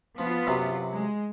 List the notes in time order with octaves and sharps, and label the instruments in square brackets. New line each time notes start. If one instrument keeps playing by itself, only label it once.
[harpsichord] F3 [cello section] B3 F4
[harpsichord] F#2 C3 F#3
[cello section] G#3